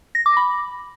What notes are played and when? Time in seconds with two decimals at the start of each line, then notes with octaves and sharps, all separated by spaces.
0.15 A#6
0.26 D6
0.37 B5